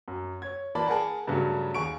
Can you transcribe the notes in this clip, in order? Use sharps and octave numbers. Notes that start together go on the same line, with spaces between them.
F#2
C#5 G#6
E3 A#3 D5 A5 B5
G#4 A#4 F#5 A5
G2 C#3 F#3 A3
D#2 G#4 C#6 D7